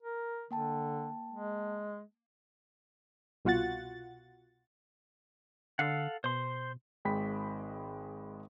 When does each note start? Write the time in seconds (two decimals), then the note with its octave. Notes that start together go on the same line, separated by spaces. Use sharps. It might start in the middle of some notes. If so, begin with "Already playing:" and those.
0.03 A#4
0.51 D3 A#3 G5 A5
1.31 G#3
3.45 C2 B2 F4 F#4 F#5 A6
5.79 D3 A4 F5 F#5
6.24 B2 C5 C6
7.05 G#1 G#3 G5 B5 B6